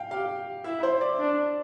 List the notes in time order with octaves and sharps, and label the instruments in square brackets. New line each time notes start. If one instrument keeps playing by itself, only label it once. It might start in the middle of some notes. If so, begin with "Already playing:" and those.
Already playing: [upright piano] F5 G5
[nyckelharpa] G4 [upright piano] F5
[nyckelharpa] E4 [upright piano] E5
[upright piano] C5
D5
[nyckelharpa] D4